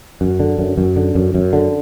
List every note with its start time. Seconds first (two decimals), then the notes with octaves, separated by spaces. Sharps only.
0.21 F#2
0.40 D3
0.58 F#2
0.78 F#2
0.96 D3
1.15 F#2
1.34 F#2
1.53 D3